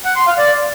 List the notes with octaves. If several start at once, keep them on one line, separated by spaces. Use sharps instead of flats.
F#5
C6
F5
D5